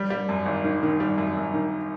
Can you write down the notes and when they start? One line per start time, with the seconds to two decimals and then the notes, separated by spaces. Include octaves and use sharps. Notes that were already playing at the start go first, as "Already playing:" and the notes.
Already playing: G3
0.10 G3
0.29 F#2
0.46 G#1
0.64 D#3
0.83 D#3
1.00 G3
1.18 F#2
1.37 F#2
1.54 D#3